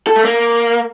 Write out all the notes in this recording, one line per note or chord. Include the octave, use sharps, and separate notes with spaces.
A4
A3
A#3